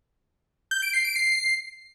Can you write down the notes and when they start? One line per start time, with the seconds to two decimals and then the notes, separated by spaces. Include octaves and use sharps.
0.71 G6
0.82 D7
0.93 C7
1.05 D7
1.16 C7